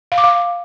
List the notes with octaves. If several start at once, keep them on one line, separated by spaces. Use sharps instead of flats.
F5
D6
F5